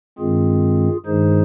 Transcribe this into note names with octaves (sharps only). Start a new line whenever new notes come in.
G2 D#3 G#3 C4 F4 G#4
G2 D#3 G#3 D#4 G#4 C5